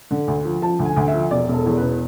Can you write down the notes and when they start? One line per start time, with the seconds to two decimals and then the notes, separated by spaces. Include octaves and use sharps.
0.11 D3
0.28 D2
0.45 F3
0.62 F3 A5
0.79 D2
0.85 G#5
0.96 D2
1.08 E5
1.14 F3
1.31 E1 D5
1.48 E1
1.54 A4
1.66 E2
1.77 B4
1.82 E1